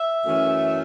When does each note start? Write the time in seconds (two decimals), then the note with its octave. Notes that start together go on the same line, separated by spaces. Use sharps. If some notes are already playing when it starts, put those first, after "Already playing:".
Already playing: E5
0.25 F#2 E3 A3 C#4